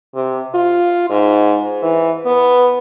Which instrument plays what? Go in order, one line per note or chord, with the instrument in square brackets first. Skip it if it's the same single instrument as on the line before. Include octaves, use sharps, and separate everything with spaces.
[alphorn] C3
F4
G#2
E3
B3